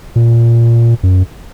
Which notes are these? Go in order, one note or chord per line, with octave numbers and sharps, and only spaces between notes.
A#2
F#2